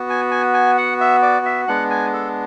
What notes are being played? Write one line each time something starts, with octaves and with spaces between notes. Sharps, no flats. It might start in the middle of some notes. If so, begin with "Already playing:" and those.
Already playing: B3 F#4
G#5
G#5
G#5
F#5
E5
D5
E5
G#3 B3 D4 F#5
G#5
A4